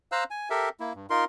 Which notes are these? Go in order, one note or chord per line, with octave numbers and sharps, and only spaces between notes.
C5 F5 A#5 E6 F#6
G#5
G4 A4 A#4 E5
A#3 E4
G2
D#4 F4 A#4 C6